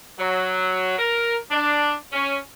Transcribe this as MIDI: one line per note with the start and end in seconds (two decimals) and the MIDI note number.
0.19 0.96 54
0.99 1.36 70
1.51 1.94 62
2.13 2.37 61